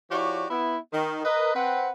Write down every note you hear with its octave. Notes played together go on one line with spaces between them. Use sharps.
F3 E4 F#4 G4 C#5 D5
B3 E4
D#3
A#4 B4 D#5
C4 B4 F#5